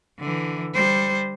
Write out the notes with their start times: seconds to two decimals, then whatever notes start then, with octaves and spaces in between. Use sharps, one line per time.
0.19 D3 E3
0.74 G3 C5